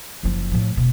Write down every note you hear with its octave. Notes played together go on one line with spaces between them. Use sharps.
F#1 F3
A2 F3
E1 B2